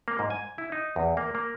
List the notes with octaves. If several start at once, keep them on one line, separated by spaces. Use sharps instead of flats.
A#3
G#2
G#5
E4
D#4
E2
A#3
A#3